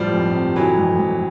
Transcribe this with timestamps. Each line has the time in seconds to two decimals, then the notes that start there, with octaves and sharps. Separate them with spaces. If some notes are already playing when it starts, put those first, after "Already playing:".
Already playing: G1 A2 F3 G3
0.13 F2
0.35 C3
0.56 G1 E3 F#3
0.78 F2
0.99 F2